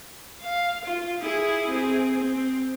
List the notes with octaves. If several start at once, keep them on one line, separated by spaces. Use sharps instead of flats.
F5
F4
E4 G#4
C4 G#4
C4